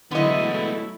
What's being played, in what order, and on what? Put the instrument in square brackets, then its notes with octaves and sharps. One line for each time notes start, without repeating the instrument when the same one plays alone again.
[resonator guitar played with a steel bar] D3 D#5 [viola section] F#3 A3 E4 [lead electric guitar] G#3 B3